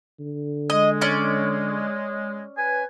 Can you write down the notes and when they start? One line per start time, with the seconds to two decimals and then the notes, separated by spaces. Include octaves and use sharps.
0.20 D3
0.70 G#3 D#5
1.01 C#4 D5
2.57 B4 G#5